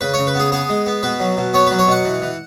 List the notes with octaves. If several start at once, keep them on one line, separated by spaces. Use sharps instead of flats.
C#3 B4
C#3 C#5
B4
B3 G#4
B3 G#4
G#3
B3
B2 B4
F#3
B2
B3 C#5
F#3 B4
C#5
B2 F#5
E3
E3